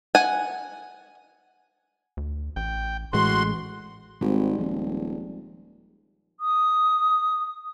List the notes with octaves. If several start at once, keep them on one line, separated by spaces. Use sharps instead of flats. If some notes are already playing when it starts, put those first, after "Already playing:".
F#5 G#5
D2
A1 G5
A1 A2 E3 G#3 F#4 C6
G#1 G3 G#3 C4
D#1 F3
D#6